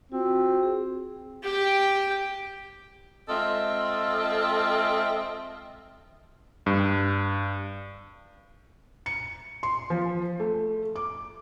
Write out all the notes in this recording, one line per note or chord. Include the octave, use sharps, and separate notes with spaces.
C4 F4 F#4
G#4
G4 G5
G#3 C4 F4 A4 D#5 E5
G2
C#7
C6
F3
A3
D6